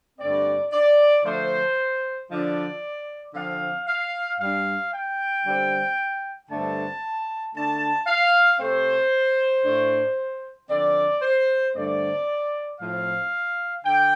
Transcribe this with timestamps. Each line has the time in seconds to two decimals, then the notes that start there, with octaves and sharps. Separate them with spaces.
0.19 G2 D3 A3 C4 D5
0.72 D5
1.24 D3 F3 A3 D4 C5
2.30 D3 F3 D4 D5
3.34 D3 F3 C4 F5
3.87 F5
4.39 G2 G3 D4 F5
4.91 G5
5.45 D3 G3 C4
6.50 G2 D3 A3 C4 A5
7.54 D3 A3 D4 A5
8.07 F5
8.60 C3 A3 C4 C5
9.65 A2 A3 D4
10.69 D3 F3 C4 D5
11.22 C5
11.74 G2 D3 A3 C4 D5
12.80 A2 F3 C4 F5
13.85 D3 G5